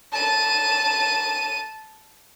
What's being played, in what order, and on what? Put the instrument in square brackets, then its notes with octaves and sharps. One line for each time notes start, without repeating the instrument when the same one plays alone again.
[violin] A5 D#7